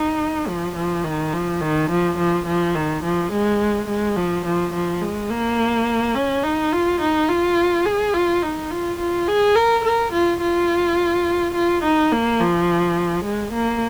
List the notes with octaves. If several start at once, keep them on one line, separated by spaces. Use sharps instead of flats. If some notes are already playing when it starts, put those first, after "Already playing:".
Already playing: D#4
F3
F3
D#3
F3
D#3
F3
F3
F3
D#3
F3
G#3
G#3
F3
F3
F3
G#3
A#3
C#4
D#4
F4
D#4
F4
G#4
F4
D#4
F4
F4
G#4
A#4
A#4
F4
F4
F4
D#4
A#3
F3
G#3
A#3